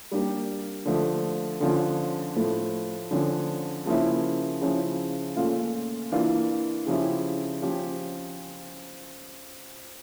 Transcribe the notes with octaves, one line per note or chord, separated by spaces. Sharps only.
G3 A#3 D4 G4
D3 F3 A3
D3 F3 C#4 F4
A2 F3 A3
D3 F3 C#4
C#3 F3 A#3 C#4 E4
C#3 F3 C#4 E4
A#2 A3 C#4 F4
E3 A#3 D4 F4
C#3 F3 C#4 E4 G4
F3 C#4 G4